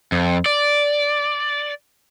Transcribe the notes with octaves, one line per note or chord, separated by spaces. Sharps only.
F2
D5